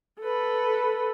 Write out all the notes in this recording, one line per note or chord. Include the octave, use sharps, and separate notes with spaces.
A4 B4